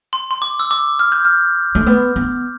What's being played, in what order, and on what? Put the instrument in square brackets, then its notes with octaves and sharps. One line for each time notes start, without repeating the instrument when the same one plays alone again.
[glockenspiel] C6
C6
D6
E6
D6
F6
G6
F6
[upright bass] A3
B3
B3